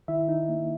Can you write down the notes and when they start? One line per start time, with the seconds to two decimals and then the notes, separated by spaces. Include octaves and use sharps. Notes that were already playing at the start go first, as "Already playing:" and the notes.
0.08 D#3 E4 E5
0.29 D#4
0.49 A#3